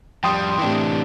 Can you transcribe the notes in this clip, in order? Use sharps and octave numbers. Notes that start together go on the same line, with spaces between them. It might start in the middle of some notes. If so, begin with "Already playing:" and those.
F2 G3 G5 C6 D#6
A2 C3 E3 D4